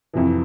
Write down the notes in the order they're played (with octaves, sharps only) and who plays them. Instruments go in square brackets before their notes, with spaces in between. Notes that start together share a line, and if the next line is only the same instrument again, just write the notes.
[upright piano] F2 C3 E3